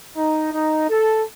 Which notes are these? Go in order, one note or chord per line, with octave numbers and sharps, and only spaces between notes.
D#4
D#4
A4